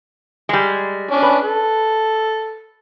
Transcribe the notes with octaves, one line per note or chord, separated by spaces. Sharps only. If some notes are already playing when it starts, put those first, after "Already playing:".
G3 G#3
C#4 D4
B4
A4